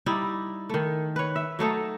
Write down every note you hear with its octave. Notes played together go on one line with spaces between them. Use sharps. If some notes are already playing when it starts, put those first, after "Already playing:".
G3 D#4 E4 D5
D#3 A3
B4 C#5
E5
F#3 A3 D#4 A4